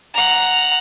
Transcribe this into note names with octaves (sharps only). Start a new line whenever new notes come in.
F#5 A#5